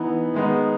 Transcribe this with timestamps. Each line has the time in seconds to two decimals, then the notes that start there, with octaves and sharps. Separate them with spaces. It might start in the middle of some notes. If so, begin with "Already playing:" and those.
Already playing: E3 B3 D#4
0.34 D#3 G#3 B3 D#4